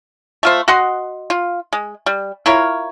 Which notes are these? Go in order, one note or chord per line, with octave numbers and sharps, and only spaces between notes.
A3 F4 C5
F#4 D#5 F#5 C6
F4
G#3
G3
E4 F4 A#4 C#5